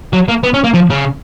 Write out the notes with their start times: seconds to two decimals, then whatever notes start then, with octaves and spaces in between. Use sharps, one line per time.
0.13 F#3
0.29 A#3
0.43 B3
0.54 C#4
0.64 A#3
0.74 F3
0.90 C#3